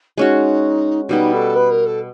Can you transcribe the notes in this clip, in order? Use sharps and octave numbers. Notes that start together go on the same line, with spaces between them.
G#3 C#4 D#4 F#4
B2 G3 B3 D#4
A4
B4
A#4
A4